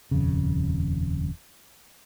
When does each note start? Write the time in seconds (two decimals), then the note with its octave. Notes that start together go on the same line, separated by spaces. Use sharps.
0.11 D#1 F2 C#3